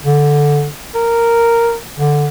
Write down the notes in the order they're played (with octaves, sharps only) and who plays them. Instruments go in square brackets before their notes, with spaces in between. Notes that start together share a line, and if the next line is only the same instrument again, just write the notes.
[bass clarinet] D3
A#4
D3